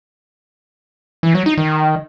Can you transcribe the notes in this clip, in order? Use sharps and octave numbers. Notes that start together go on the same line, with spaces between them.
E3
F#3
D#4
D#3